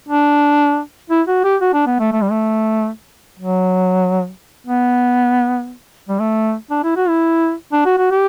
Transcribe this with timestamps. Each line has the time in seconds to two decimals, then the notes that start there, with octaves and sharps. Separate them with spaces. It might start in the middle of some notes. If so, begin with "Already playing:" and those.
0.09 D4
1.10 E4
1.27 F#4
1.44 G4
1.61 F#4
1.74 D4
1.87 B3
2.00 A3
2.12 A3
2.22 G3
2.31 A3
3.39 F#3
4.66 B3
6.09 G3
6.19 A3
6.71 D4
6.84 E4
6.97 F#4
7.09 E4
7.73 D4
7.86 F#4
7.98 F#4
8.11 G4